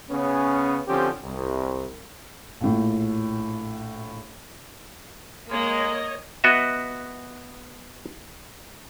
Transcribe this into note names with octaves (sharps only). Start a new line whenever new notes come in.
C#3 B3 C#4
D3 F3 C4 C#4 G4
C2
A#1 A2
G#3 A#3 C#5 D#5
B3 F#4 D#5 E5